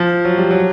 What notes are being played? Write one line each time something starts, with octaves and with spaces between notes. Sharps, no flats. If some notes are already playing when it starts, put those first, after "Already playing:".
Already playing: F3
F#3
G3
F#3